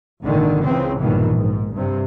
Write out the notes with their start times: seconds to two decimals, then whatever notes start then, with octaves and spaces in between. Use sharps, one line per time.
0.21 G#1 A#2 D3 D#3
0.63 C#2 C#3 E3 C4
0.99 A#1 G2 B2 D#3 E3
1.34 G#2
1.73 G2 C3